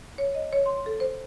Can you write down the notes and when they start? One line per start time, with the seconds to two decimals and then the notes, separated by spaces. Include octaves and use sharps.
0.18 C#5
0.35 D#5
0.53 C#5
0.66 C6
0.86 A4
1.00 C5